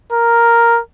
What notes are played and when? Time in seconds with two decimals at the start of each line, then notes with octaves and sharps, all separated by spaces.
0.12 A#4